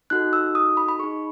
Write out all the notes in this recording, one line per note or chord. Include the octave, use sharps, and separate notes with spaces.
D#4 F#4 A4 F#6
E6
D#6
B5
B5
D#4 G#4 C#6